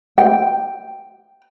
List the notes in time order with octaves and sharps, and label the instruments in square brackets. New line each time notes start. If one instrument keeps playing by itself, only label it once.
[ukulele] G5